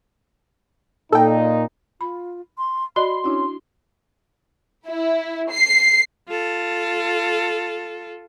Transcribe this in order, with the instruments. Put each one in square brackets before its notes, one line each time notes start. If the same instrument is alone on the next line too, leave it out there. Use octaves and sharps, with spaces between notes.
[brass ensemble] A#2 D#4 [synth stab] A4 G5
[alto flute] F4 [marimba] B5
[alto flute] C6
[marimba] F#4 D5 D#5 [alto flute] B5 [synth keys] C6
[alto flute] C#4 [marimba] D4 E4 F#4
[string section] E4
C7
[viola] F4 A4